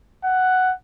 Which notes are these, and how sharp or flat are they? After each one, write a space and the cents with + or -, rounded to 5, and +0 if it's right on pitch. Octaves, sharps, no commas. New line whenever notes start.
F#5 +5